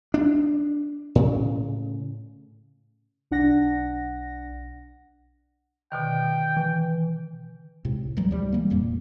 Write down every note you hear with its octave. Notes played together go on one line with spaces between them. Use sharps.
D4
A2 C#3
B1 D4 F#5 A#6
B2 D3 D#3 G5
E3
C#2 A2 C3
D2 E3 F#3 G3
D2 G#2 F3 G3
E3 G3 A3 A#3
F1 F2 A#2 A#3